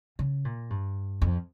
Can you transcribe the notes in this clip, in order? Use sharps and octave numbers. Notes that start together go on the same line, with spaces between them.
C#3
A#2
G2
F2